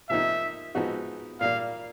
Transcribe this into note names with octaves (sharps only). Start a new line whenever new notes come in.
C3 F3 A#3 D#4 E5
F3 G#3 B3 D#4 F#4
A#2 G3 A#3 F5